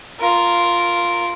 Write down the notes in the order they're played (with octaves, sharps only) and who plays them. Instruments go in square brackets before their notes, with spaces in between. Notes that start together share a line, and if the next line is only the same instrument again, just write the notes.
[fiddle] F4 A#4